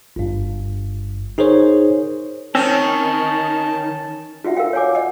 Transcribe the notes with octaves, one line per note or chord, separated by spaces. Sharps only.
G1 G2
D#4 G#4 A#4 C5 C#5
D#3 C4 C#4 A5
F4 F#4 E5 F#5
A#4 E5 F5 G5
C#5 F#5 G#5 D6
D#5 F#5